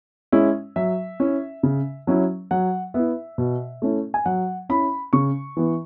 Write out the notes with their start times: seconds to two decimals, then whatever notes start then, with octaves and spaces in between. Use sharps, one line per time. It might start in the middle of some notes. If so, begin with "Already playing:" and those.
0.32 G#3 C#4 E4
0.76 F#3 E5
1.20 C#4 E4
1.63 C#3
2.07 F#3 C#4 E4
2.51 F#3 F#5
2.94 B3 E4 E5
3.38 B2
3.82 A3 C#4 E4
4.14 G#5
4.26 F#3 F#5
4.69 C#4 E4 B5
5.13 C#3 C#6
5.57 E3 B3